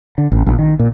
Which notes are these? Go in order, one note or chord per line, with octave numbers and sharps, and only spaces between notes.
D3
A1
A#1
D#3
A#2